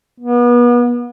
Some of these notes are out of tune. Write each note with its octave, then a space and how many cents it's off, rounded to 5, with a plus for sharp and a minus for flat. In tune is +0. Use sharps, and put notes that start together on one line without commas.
B3 -35